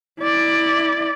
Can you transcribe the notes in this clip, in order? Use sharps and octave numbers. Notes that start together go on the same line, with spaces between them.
E4 D5